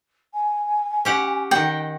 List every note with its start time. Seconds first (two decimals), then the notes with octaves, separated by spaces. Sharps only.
0.33 G#5
1.05 C#4 G4 F#5
1.51 D#3 F#5 G5